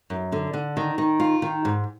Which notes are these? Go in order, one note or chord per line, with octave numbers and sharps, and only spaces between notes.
F#2
D3
D3
D#3
D#3
F4
D#3
G#2